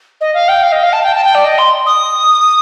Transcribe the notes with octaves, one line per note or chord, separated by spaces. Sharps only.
D#5
F5
G5
F5
D#5
F5
A5
G5
A5
G5
D5
D#5
C6
D#6